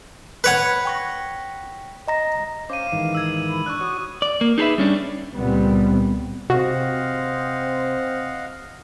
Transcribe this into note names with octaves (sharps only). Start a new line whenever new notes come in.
B4 C#5 F#5 B5 G#6
G5 C#6 A#6
D#5 A#5 A#6
C#4 C5 F5 D6 D#7
G#2 D#3 E3
E6 G#6
B5
D4 C#6 E6 F#6
F#4 C#5 D#6
D5
A#3
D#4 G#4 A4 B4 E5
G3 C#4 D4
C#2 A#2 G3 B3 C4
C3 C4 F#4 C5 D#5 F5 F#5